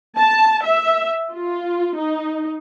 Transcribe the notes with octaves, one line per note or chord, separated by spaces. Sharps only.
A5
E5
F4
D#4